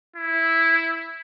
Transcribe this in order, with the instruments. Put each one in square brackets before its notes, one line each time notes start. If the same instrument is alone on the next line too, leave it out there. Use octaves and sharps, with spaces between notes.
[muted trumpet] E4